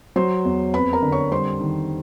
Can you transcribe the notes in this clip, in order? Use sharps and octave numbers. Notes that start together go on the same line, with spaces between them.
F#3 C5 C6
E2
F2 B4 B5
A#4 A#5
D3
C#5 C#6
G3 C5 C6
D#3